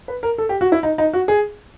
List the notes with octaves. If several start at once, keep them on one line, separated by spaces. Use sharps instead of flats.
B4
A#4
A4
G4
F#4
E4
D#4
D#4
F#4
G#4